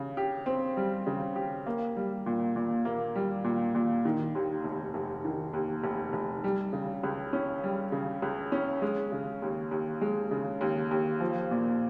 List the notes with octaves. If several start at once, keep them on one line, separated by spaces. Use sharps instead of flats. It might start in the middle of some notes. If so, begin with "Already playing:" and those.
Already playing: C#3
G4
C4
G3
C#3
G4
A#3
G3
A#2
A#2
A#3
G3
A#2
A#2
D#3
D#2
F1
F1
D#3
D#2
F1
F1
G3
C#3
C#2
C#4
G3
C#3
C#2
C#4
G#3
C#3
D#2
D#2
G#3
C#3
D#2
D#2
F3
A#2